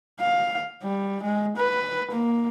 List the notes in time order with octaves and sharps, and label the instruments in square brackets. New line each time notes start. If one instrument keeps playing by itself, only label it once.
[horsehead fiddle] F5
G3
G#3
B4
A#3